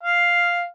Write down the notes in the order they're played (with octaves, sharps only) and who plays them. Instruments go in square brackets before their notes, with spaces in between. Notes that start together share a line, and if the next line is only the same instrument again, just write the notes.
[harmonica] F5